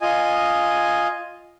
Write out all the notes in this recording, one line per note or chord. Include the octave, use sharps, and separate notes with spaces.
F4 D#5 G#5